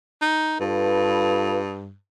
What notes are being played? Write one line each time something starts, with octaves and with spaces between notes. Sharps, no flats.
D#4
G2 F4 A4 B4